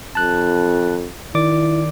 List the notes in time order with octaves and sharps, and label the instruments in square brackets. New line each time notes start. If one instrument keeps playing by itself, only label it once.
[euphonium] F2 [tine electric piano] A5 F#6
[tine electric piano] D#3 D5 D6 [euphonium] E4